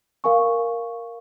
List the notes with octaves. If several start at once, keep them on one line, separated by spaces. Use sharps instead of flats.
A#4 F5 G#5 C#6